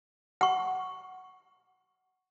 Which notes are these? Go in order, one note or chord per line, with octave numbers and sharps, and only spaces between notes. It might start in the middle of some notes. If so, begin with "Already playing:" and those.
F#5 C#6